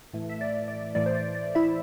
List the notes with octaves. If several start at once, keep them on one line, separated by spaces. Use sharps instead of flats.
A2 E3 A3
E5
D5
D5
A2 E3 A3 D5
C5
D5
D5
E4 E5